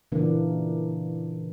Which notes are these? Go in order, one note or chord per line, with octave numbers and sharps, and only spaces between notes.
A#2 C#3 E3 A#3 D4